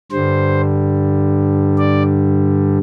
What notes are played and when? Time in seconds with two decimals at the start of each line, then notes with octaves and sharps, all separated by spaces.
0.11 G2 D3 G3 C5
1.78 D5